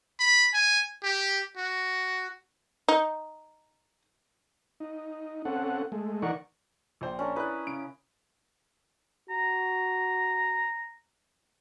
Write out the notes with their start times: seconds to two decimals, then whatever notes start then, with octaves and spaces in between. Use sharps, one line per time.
0.20 B5
0.54 G#5
1.04 G4
1.57 F#4
2.88 D#4
4.80 D#4
5.45 C4 C#4 A4 F#5
5.92 G#3 A3
6.22 E3 D#4 A#4 D5 F#5 C#6
7.01 A#1 C5 G5
7.19 C#4 D4 A#4
7.36 E4 A#4 B4 D5 D#6 F#6
7.67 C#3 D7
9.30 F#4 A#5